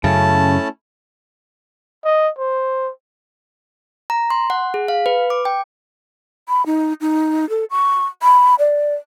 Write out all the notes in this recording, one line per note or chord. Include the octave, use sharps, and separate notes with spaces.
F#2 C#3 A3 C#4 E4 A5
D#5
C5
A#5
C6
F#5
G#4
F5
B4
D6
G5
B5
D#4
D#4
A4
C#6
B5
D5